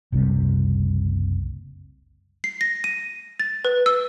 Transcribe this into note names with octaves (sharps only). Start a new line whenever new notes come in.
F#1 C2 C3 G3
C7
A#6
D#7
A6
B4
E6